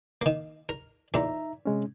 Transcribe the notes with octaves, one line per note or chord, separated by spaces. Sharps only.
D#3 A#3
A#4
E2 A#2 D#4 E5 A#5
C3 G#3 C#4